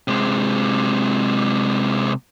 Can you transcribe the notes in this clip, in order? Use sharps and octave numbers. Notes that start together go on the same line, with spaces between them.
C3 G#3